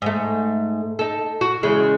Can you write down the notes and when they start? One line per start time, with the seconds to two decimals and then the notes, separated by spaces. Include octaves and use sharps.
0.02 G#2 A3
0.99 D#4 A4
1.41 F#4
1.63 E2 C#3 G#3